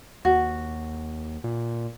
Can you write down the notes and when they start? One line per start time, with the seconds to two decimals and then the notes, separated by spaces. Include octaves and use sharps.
0.25 D#2 F#4
1.44 A#2